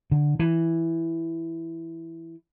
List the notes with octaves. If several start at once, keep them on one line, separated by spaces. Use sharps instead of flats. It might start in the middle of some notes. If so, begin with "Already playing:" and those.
D3
E3